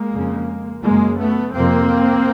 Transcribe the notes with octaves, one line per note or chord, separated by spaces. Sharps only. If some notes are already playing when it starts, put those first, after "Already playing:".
Already playing: G#3 A#3
F2 C#3
F#2 C#3 G#3 A#3
A3 B3
F2 C3 A#3 C4